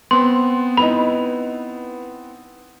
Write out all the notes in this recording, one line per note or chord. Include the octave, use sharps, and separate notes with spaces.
B3 C4 C6
D#4 E4 B4 B5